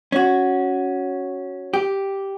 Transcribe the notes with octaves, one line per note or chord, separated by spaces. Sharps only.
C#4 F#4
G4